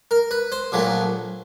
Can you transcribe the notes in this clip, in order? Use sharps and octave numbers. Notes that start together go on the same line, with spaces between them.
A#4
B4
C5
A#1 A#2 F#3 A3